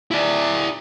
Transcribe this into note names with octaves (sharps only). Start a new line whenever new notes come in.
E4 D5